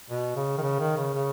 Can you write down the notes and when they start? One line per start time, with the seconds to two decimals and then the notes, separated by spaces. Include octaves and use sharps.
0.10 B2
0.36 C#3
0.58 D#3
0.62 C#3
0.79 D#3
0.97 C#3
1.14 C#3